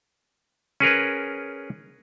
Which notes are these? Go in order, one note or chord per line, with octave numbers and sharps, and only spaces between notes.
C#4 G#4 A#4 B4